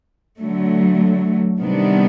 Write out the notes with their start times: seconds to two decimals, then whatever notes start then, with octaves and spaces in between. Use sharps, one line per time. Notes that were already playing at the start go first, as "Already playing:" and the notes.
0.40 D3 F#3 A3
1.61 C3 D#3 G3 B3 D4